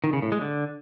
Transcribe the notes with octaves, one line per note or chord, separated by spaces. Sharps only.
D#3
C#3
A2
G#3
D3